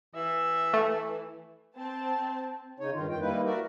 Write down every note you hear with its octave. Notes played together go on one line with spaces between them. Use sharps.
E3 E5
A3
C4 A5
C#3 D#4 C#5
G2 D#3 F4
F2 D#3 G5
G3 A#3 D#4 E4 B4
F#4 A#4 D5 E5